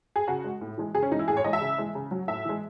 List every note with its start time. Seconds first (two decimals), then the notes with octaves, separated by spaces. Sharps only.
0.16 G#4
0.28 C#3 F#4
0.44 G#3
0.61 A2
0.78 E3 G#3
0.95 C#3 G#4
1.02 C#4
1.11 E3 G#3 D#4
1.19 E4
1.28 A2 G#4
1.37 C#5
1.44 E3 G#3 D#5
1.53 E5
1.61 C#3
1.78 E3 G#3
1.95 C#3
2.11 F#3
2.28 A2 E5
2.45 E3 G#3